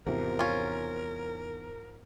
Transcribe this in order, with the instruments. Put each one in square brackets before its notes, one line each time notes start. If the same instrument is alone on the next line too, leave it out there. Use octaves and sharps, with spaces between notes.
[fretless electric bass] E2 C3 [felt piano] G#2 F3 [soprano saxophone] A#4
[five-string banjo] C#4 F4